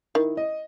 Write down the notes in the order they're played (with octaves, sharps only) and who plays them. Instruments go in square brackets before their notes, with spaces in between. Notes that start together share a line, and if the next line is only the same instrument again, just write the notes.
[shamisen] D#3 [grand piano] E4
[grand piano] D#5